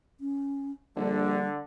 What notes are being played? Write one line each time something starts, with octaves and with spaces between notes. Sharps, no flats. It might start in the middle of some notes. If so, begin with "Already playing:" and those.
C#4
A#1 D3 G3